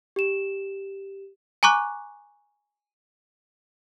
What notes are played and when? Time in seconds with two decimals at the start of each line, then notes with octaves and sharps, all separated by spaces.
0.16 G4 E7
1.63 G#5 A#5 C#6 D6 F#6